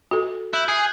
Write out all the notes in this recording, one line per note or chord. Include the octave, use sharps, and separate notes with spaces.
F#4 A4
E4 F#6 G6 F#7
G#4 G#6 C7